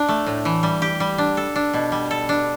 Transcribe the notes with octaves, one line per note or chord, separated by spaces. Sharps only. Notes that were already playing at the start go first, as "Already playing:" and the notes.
Already playing: D4
A3
A2
E3
G3
G4
G3
D4
A4
D4
B2
G3
A4
D4